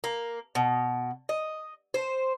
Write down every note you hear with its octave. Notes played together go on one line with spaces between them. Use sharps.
A#3
B2
D#5
C5